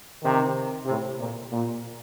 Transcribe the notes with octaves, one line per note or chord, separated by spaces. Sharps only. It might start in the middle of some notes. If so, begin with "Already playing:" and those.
C3 D#3
A2 C3
A#2
A#2